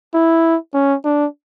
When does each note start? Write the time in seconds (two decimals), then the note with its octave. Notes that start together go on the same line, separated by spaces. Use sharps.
0.14 E4
0.74 C#4
1.05 D4